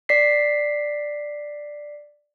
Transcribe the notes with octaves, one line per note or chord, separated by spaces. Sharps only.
D5 B6 C7